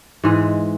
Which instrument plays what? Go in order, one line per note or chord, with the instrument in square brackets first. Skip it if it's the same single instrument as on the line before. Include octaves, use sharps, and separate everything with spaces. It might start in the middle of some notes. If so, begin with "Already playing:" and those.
[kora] G#2 E3 G#3